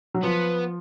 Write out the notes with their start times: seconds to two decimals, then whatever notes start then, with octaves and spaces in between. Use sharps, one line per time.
0.14 F#3
0.23 F3 B3